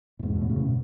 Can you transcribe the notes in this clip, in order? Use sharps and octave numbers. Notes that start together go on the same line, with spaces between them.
A2
E2 G#2
B2
F#2 A2
C#3
B2